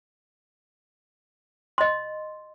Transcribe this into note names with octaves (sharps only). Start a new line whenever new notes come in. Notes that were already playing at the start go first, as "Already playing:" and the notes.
D#5 C6